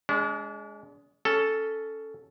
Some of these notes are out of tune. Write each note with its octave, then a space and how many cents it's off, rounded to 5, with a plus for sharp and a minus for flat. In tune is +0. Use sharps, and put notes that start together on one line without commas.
G#3 +5 D4 -40
C#4 +10 A4 +0